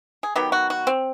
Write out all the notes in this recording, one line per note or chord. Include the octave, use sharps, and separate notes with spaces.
G#4
D#3 F#3 B3 G4
F#4
F#4
C4